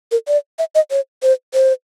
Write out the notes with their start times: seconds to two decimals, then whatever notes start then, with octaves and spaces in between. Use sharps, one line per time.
0.11 A#4
0.28 D5
0.59 E5
0.75 D#5
0.91 C#5
1.23 C5
1.54 C5